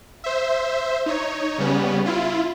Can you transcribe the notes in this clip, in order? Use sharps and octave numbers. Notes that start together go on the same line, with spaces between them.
C5 E5
D#4 C#5
C#3 G3 B3 C#4
E4 F4